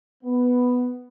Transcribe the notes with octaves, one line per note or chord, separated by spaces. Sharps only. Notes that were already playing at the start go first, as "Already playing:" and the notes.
B3